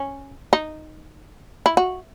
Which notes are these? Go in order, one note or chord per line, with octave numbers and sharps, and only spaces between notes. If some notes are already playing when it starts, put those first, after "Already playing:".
Already playing: C#4
D#4
E4
F#4